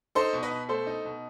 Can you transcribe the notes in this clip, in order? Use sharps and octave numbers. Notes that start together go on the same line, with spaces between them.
D#4 A4 C5
B2
B4 D#5
B2
A3 A4 C5
D#4
B2